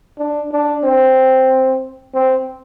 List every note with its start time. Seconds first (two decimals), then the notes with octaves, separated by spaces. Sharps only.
0.18 D4
0.52 D4
0.84 C4
2.14 C4